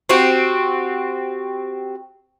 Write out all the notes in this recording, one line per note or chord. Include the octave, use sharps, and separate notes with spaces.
C4 F#4 G4